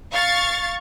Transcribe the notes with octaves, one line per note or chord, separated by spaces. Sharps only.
F5 C#6 A6